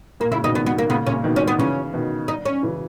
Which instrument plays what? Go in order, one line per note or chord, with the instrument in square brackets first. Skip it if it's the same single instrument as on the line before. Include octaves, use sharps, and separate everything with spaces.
[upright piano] A#2 [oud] A#3
[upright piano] A#2 C#3 [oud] E4
[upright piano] B2 D#3 [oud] D#4
[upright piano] B2 D#3 [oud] B3
[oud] B3
A#3
[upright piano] A#2 C#3 [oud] B3
[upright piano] A#2 C#3 [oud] C#4
[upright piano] B2 D#3
[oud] C#4
B3
[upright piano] C#3 E3 [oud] C#4
[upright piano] B2 D#3
[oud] D#4
C#4
[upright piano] C#3 E3